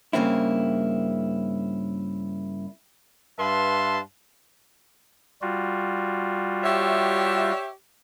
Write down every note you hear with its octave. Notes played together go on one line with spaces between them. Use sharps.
G2 C#3 A#3 C4 E4
G2 B4 E5 F5 A5 C6
G3 F4 F#4
G4 C#5 E5